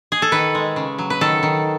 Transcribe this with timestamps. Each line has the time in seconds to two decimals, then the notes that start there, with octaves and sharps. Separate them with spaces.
0.12 G#4
0.22 A4
0.32 D#3 B4
0.55 G#3
0.76 C#3
0.99 F#3
1.10 B4
1.21 D#3 A4
1.43 D#3